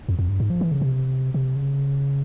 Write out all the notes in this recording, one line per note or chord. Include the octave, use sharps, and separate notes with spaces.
F2
F2
G2
G#2
F3
E3
C#3
C3
C3
C#3